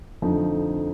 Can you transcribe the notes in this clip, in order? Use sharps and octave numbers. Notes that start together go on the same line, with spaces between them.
F2 D3 F3 A3 D#4